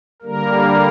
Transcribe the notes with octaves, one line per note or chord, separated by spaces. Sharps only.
D3 G3 A#3 A#4